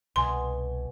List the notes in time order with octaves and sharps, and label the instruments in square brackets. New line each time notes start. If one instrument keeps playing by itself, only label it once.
[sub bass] C2 [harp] B2 G#5 [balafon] C6